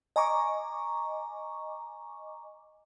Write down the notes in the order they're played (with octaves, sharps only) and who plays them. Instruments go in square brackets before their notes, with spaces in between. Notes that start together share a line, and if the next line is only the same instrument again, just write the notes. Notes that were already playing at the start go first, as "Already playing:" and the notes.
[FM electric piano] D#5 G#5 A#5 C#6 D6